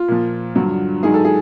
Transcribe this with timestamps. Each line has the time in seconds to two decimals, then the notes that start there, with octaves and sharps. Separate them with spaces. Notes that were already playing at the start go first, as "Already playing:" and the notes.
Already playing: F4
0.08 A#2 F3
0.55 G2 D3 F#3
1.03 G#2 D#3 F#3 G#4
1.14 A4
1.25 G#4